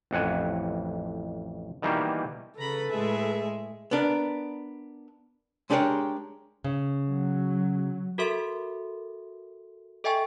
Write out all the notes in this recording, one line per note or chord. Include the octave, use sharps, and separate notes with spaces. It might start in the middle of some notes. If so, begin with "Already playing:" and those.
A1 F2 F#5 G#5
B2 D#3 E3 G3 A#3
C#3 A4 B4 A#5 B5
A2 G#3 G#4 E5
B3 D4 A#4
G#3 D4 G4 G#4 A#4 C#5
C#3
F#3
F#4 A4 A#4 E5 C6
A4 D#5 E5 G5 G#5 C#6